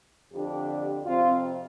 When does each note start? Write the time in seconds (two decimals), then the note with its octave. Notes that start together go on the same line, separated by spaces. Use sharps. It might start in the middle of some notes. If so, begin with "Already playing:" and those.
0.33 F2 D3 D4 G4
1.06 F2 C3 C4 F4